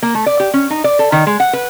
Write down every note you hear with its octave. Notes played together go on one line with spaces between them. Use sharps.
A#3
A3
D5
G4
C#4
D#4
D5
A4
D#3
G#3
F#5
B4